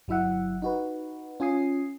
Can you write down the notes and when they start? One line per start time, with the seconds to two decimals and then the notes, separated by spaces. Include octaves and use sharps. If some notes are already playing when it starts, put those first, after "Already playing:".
0.08 G1 F#3 E4 E5 F#5
0.62 D#4 F#4 B4
1.40 C#4 F4 G#5 D#6 C7